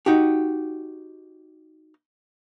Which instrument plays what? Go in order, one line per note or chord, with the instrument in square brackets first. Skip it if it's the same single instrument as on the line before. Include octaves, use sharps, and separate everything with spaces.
[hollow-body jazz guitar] D#4 F#4 G4